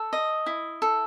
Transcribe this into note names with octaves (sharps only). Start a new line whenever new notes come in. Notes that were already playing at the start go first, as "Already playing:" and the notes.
Already playing: A4
D#5
E4
A4